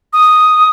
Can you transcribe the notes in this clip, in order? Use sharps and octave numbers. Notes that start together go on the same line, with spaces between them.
D#6